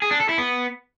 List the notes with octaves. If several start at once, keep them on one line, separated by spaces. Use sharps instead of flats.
G#4
D4
A4
E4
B3